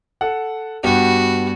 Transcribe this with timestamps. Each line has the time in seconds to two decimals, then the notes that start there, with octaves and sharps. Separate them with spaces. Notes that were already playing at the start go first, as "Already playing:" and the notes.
0.21 A4 F#5
0.84 G2 B3 F#4 G4